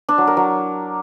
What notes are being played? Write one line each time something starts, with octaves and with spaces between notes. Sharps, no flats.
D4
F#3
A#4
F#3